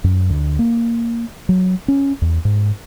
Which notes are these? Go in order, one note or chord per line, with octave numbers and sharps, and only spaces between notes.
F#2
D2
A#3
F#3
C#4
E2
G#2